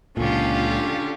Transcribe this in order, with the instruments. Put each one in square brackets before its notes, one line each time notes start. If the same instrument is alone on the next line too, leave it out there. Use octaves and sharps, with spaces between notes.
[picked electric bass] C#2 A#2 [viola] D3 F4 [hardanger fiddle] C#4 G4